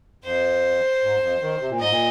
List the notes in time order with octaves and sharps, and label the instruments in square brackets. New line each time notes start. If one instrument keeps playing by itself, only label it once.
[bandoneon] F2 [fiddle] C5
[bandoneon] G#2
F2
D#3
C3
A#2
[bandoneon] G#2 [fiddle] D#5
[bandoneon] A#2